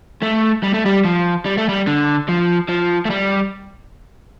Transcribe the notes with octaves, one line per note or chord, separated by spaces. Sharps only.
A3
G3
A3
G3
F3
G3
A3
G3
D3
F3
F3
A3
G3